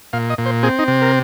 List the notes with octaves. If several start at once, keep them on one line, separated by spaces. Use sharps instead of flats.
A#2 F5
D#5
A#2
C5
C4 G#4
D#4
C3
A#4